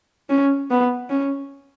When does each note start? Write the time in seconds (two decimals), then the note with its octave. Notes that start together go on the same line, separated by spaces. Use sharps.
0.29 C#4
0.71 B3
1.10 C#4